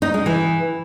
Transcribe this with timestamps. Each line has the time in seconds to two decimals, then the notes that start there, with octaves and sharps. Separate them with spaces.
0.02 D#4
0.14 G#3
0.26 E3